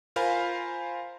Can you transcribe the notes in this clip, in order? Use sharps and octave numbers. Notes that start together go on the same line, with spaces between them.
F4 A#4 C5 F5 G#5 B5